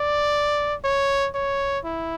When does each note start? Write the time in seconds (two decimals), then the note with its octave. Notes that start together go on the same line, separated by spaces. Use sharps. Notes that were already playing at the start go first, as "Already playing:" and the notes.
Already playing: D5
0.85 C#5
1.35 C#5
1.85 E4